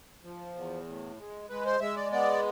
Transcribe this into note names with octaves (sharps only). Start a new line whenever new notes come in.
F3
E2
A2
G#3
G#3 B4
C5
G#3 E5
D5
B3 D5